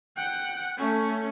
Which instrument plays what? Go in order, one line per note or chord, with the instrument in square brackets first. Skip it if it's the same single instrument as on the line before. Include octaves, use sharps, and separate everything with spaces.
[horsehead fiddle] F#5 G5
A3 C#4